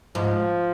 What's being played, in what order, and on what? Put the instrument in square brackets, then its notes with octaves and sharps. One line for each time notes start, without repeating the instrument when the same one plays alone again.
[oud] G#2 [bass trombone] F3